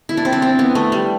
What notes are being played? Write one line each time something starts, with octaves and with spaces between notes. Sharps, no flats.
E4
D4
C4
D4
C4
B3
A3
G3